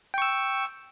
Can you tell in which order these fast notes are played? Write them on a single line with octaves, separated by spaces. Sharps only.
G5 C#6 E6